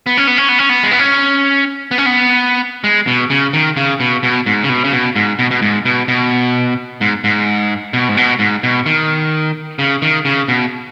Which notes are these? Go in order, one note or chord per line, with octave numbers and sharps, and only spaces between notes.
B3
C#4
B3
C#4
B3
C#4
B3
G#3
B3
C#4
B3
C#4
B3
G#3
B2
C#3
D#3
C#3
B2
B2
G#2
C#3
B2
C#3
B2
G#2
B2
B2
G#2
B2
B2
G#2
G#2
B2
G#2
B2
G#2
B2
D#3
C#3
D#3
C#3
B2